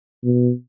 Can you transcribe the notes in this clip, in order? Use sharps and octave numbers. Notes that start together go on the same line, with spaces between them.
B2